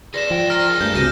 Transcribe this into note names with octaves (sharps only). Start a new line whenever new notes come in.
G#4 B4 D5 A#6 E7
G#2 F3 G5
G5 A#5 F6 A#6
G#4 A#4 A5
G2 A3 G6
C#2 G2 C3 F#4 F6 A#6 D#7